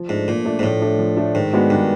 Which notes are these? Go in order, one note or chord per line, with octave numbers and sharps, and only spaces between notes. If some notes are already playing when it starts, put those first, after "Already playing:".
Already playing: F3
G#2 A3 D4
A#2 F3
A3 D4
G#2
A2 F3
A3 D4
F3
A3 D4
G#2 D#3
G#3 B3 D4 F#4
G2 D#3